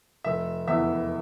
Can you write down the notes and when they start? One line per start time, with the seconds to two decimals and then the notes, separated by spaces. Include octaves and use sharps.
0.24 F1 E5
0.68 E2 E3 E5